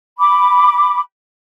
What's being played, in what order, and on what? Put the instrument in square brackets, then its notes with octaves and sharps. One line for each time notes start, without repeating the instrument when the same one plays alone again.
[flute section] B5 D6